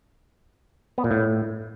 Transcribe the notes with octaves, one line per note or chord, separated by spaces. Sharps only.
B3
A#2
A2